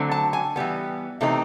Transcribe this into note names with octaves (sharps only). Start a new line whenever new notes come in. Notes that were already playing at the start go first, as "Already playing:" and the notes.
Already playing: D3 F#3 A3 C4
A5
G#5
E3 G3 B3
C3 E3 A3 C4 D#4